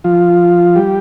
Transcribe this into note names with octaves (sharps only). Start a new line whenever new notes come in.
F3 F4
G3 G4